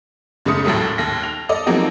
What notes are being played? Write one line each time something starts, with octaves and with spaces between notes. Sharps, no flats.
F#1 C#3 G#3 A3 D#6 C#7
A#1 D#2 A2 F#3 A3
D#2 A#6
F7
A4 D5 D#5
F3 F#3 G#3 A#3 C4 D#4